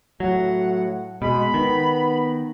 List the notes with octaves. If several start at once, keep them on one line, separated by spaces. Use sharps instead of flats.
A2 F#3 F#5
B2 G#3 B5
D#3 B3